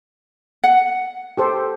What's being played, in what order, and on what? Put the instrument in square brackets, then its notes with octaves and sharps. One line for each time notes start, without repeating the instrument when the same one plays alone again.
[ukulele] F#5
[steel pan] G4 A4 C5